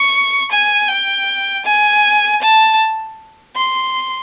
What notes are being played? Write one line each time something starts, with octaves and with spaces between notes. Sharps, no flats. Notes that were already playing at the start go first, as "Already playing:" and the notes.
Already playing: C#6
G#5
G5
G#5
A5
C6